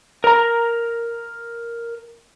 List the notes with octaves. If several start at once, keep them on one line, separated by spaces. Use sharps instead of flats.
A#4 A#5